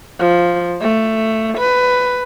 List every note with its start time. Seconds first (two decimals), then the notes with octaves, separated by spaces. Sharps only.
0.19 F3
0.81 A3
1.58 B4